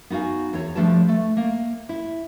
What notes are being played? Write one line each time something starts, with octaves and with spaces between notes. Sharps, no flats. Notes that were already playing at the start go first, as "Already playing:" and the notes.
B3 D#4 F#4 F5 G#5
E2 C#5
F3 G3 A3 D4 B4 A5
A3
A#3
E4